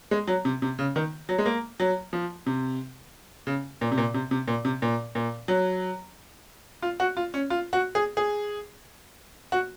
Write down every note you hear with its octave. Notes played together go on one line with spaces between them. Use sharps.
G#3
F#3
C3
C3
C#3
D#3
F#3
G#3
A#3
F#3
F3
C3
C#3
A#2
C3
A#2
C3
C3
A#2
C3
A#2
A#2
F#3
F4
F#4
F4
C#4
F4
F#4
G#4
G#4
F#4